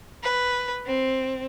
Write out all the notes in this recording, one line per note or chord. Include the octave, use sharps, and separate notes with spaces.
B4
C4